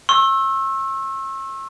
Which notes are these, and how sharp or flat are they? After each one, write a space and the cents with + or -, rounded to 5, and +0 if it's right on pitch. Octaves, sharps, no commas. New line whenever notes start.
C#6 -45 E6 +0